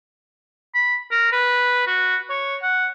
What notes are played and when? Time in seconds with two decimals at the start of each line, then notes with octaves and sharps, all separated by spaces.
0.74 B5
1.11 A#4
1.32 B4
1.86 F#4
2.30 C#5
2.62 F#5